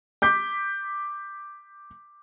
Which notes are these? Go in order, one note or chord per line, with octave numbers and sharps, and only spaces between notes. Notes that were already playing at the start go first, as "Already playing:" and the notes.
D6 G6 B6